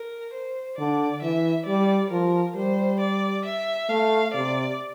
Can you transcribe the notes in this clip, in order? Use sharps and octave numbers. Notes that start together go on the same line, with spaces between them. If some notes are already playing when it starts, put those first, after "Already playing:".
Already playing: A#4
C5
D3 D5
E3 E5
G3 D5
F3 A#4
G3 C5
D5
E5
A3 F5
C3 D5